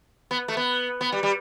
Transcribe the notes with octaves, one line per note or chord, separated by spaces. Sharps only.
B3
A3
B3
B3
G3
G3